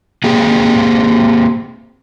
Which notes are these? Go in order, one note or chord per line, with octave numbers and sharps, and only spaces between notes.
A#3 C4 G4 G#4